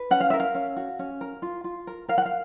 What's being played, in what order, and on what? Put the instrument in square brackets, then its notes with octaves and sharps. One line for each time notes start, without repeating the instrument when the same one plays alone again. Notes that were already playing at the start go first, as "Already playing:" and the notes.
Already playing: [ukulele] B4
C#4 F#5
F5
A#4 E5
F5
C#4
F#4
C#4
A#4
F4
F4
A#4
A#4 F5
F#5
F5